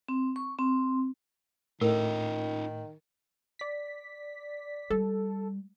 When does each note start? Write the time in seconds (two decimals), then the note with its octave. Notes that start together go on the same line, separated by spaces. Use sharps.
0.09 C4
0.36 C#6
0.58 C4
1.81 A2 D#3 D#4 F4 A#4
3.59 D5 B6
4.90 G3 A4